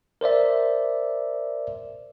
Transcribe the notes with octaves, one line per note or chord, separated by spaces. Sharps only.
A#4 C5 D5 E5